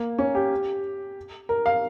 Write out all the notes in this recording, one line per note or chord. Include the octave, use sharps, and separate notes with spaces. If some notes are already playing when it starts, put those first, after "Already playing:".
Already playing: A#3
C#4
G4
A#4
F5